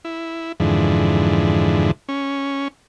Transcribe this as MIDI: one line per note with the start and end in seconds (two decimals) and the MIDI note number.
0.05 0.52 64
0.60 1.91 41
0.60 1.91 44
0.60 1.91 50
0.60 1.91 52
2.09 2.68 61